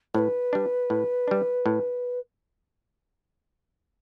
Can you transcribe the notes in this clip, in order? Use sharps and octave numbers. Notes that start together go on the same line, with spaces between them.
A2 B4 C5
G3 D4
A2
G3 D4
A2